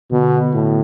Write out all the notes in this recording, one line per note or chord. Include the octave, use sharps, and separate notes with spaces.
B2 D3
A2